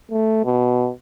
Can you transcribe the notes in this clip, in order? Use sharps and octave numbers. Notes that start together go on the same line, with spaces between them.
A3
B2